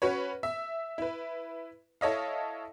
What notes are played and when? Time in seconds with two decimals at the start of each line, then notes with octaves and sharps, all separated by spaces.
0.02 C#4 F#4 B4 C#5
0.43 E5
0.98 E4 B4
2.01 E4 A4 C#5 D#5 F5